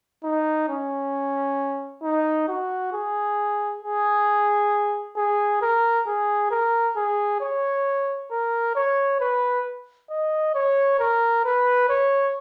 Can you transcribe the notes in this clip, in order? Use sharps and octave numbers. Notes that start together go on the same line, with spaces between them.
D#4
C#4
D#4
F#4
G#4
G#4
G#4
A#4
G#4
A#4
G#4
C#5
A#4
C#5
B4
D#5
C#5
A#4
B4
C#5